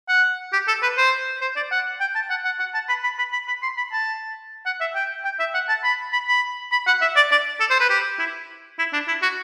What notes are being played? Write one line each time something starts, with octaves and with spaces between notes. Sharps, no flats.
F#5
G4
A4
B4
C5
C5
D5
F#5
G5
A5
F#5
F#5
F#5
A5
B5
B5
B5
B5
B5
C6
B5
A5
F#5
E5
G5
G5
E5
F#5
A5
B5
B5
B5
B5
F#5
E5
D5
D5
A4
C5
B4
G4
E4
E4
D4
E4
F#4